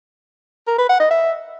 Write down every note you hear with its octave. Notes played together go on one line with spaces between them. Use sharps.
A#4
B4
F#5
D#5
E5